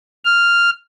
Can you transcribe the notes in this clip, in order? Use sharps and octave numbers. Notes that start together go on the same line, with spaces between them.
F6